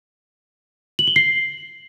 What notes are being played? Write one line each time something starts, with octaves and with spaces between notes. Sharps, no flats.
F#7
G7
C7